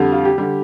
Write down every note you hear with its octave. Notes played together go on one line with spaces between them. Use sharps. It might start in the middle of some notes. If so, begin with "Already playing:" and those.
Already playing: F2 D3 G3
F4
G4
D3 G3